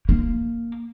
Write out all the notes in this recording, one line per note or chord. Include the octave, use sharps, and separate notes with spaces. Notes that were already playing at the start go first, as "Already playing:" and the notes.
A#3